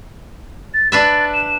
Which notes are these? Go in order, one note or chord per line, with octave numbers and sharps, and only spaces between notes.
A6
D4 B4 E5 A6
E7